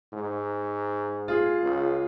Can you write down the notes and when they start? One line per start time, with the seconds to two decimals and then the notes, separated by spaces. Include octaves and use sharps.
0.13 G#2
1.28 F4 G#4
1.63 C#2